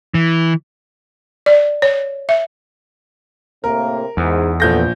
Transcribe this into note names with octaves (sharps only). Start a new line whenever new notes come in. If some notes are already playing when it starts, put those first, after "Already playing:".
E3
D5
C#5
E5
A2 C3 A#3 A#4
E2 G#2
A#1 B3 A4 G6 A#6